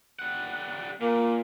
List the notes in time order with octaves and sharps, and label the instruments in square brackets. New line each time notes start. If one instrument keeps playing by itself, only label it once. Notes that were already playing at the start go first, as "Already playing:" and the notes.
[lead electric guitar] G3 F#5
[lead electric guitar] A#2 [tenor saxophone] A#3